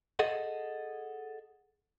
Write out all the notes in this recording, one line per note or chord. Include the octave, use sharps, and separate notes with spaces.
G#4 A4 D#5 F#5